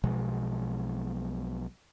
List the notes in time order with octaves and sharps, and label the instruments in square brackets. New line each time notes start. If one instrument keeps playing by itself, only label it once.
[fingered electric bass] B1 B2 F3 G#3